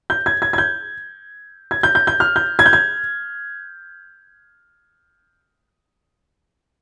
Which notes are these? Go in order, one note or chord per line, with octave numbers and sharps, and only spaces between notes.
G6
G#6
G#6
G#6
G6
G#6
G6
G6
G6
F6
G6
G#6
G6
G#6